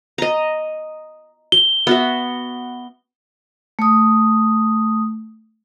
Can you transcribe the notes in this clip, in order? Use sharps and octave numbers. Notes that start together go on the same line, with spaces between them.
D#5 A#5
G7
B3 F#4 E5
A3 D#6